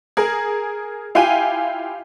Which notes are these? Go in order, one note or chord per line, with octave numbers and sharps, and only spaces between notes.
G#4 A#4
E4 F4 G4 G5 G#5 D#7